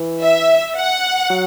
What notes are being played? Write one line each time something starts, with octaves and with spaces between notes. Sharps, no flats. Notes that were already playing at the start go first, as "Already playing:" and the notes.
Already playing: E3
E5
F#5
F#3